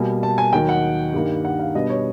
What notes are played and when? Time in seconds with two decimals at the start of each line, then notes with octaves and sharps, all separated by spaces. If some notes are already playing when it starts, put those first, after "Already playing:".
Already playing: B2 G3 A#3 G#5
0.23 A5
0.38 G#5
0.53 D#2 D#3 F#3 G5
0.69 F#5
1.13 G2 D#3 G3 A#3 D#4
1.45 F#5
1.59 F5
1.75 B2 G3 B3 D4 D#5
1.89 C#5